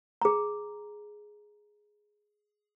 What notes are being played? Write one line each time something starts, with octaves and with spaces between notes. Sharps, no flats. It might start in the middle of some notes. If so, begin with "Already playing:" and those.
G#4 A#5